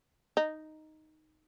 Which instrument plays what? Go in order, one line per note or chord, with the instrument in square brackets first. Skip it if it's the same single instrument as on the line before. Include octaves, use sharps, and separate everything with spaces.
[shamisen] D#4